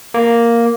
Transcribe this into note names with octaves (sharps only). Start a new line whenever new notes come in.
A#3